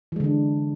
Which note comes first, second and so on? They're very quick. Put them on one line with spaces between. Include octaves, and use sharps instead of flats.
E3 G#3 D3 D4